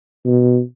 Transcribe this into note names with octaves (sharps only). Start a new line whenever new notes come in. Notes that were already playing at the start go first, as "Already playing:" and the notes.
B2